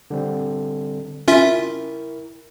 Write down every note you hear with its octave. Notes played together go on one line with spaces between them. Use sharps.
D3 G3 C4
C#4 E4 F4 A#4 E5